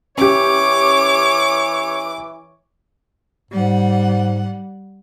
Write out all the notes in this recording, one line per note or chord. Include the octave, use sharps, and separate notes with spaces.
E3 C#4 G4 C#5 D6
G#2 G3 F#5